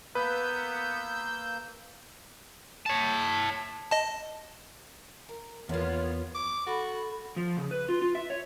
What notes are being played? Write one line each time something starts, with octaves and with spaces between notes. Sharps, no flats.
A#3 B3 B4 E6 G6
C#5 A5
D#5 A5
A#4
E2 D3 A#3 B3 F4 C#5
D6
F#4 A4 B5
F3
C#3
B4
F4
F4
E5
C#5